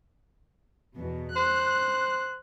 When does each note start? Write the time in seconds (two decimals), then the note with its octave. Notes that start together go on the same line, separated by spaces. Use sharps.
0.97 E2 B2
1.36 C5 F#6